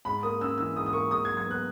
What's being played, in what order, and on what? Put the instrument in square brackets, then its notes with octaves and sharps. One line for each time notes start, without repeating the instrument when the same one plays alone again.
[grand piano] G#2 B5
A#3 D#6
C#4 E6
E3 E6
G#2 D#6
D#6
A#3 C#6
G#2 D#6
G#6
F#3
G#6
B3 F#6